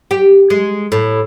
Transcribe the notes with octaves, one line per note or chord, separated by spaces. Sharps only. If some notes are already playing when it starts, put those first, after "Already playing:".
G4
G#3
A2